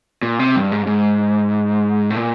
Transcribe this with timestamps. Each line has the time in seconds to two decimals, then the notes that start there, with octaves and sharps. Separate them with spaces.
0.23 A#2
0.39 C3
0.56 G2
0.72 G#2
0.82 G2
0.87 G#2
2.10 A2
2.16 A#2